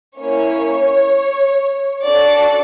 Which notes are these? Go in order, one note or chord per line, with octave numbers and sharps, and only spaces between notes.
A#3 C#4 E4 C#5
D4 F#4 A4 D5